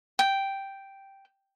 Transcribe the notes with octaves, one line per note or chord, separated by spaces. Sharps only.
G5